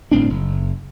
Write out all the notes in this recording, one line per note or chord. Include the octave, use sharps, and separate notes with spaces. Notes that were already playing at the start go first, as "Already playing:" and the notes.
G1 A2 C4 D4
F#1